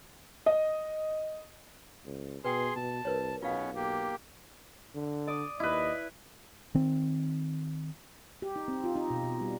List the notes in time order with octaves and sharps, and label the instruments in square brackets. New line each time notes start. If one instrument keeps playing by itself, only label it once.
[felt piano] D#5
[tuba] C#2
[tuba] B2 [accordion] G#4 C6 [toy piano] B4 G5 D#6
[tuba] B2 [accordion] A5
[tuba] C2 [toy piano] A#4 B4 C#5
[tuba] B1 [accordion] B2 B3 C#4 [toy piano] F4 F5
[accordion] A#3 G4
[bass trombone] D3
[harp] D5 D6 D#6
[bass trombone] D#2 [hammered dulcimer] E4 B4 [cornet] D#5
[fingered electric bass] D#3 C4
[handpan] G4
D#4
C4
F4
D#4
B2
B2
G3